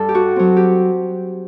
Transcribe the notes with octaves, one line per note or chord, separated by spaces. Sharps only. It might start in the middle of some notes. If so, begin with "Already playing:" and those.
Already playing: G2 A4
G4
F#4
F#3 C4
G4